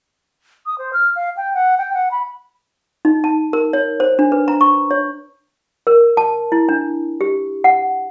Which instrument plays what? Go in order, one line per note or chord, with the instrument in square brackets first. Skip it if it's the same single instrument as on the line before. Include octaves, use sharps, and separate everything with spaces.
[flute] D#6
C5
F6
F5
G5
F#5
G5
F#5
B5
[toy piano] D#4
A5
A#4
C#5
C5
D4
B4
A#5
C#6
C#5
A#4
A5
E4
D4
G4
F#5